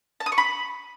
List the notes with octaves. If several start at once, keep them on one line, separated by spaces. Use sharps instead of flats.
A5
D#6
C#6
B5